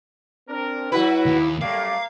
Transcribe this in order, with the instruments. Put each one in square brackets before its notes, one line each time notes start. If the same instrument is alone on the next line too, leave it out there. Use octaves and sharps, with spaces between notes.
[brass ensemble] C4 D4 A#4
[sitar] F#3 F#4 B4 [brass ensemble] E4
[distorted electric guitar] D#2
[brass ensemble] F#2 G3 A3 [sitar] A#3 [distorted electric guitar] F5